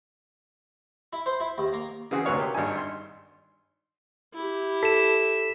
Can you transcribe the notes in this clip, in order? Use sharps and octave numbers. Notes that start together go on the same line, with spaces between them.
E4
C5
E4
D#2
A#3
C#3 E3 C4 F#4 G#4
D2 C3 B4 C#5 F5
A#3 G4
G#1 G2 D#4 E5 G#5
C6
E4 G4
A4 B6 E7